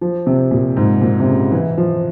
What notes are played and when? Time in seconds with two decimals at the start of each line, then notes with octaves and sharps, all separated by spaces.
0.01 F3
0.27 C3
0.51 A#2
0.77 G#2
1.01 A#2
1.20 C3
1.28 C#3
1.52 E3
1.78 F3